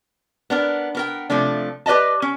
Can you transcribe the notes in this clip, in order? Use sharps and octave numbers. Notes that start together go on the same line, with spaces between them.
B3 D4 A#4
B3 A#4 G5
C3 F3 A3 D4
G4 B4 D5 D#5 A5
C#4